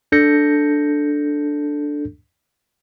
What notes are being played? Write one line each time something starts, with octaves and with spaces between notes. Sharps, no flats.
D4 A4 G6 A#6 C#7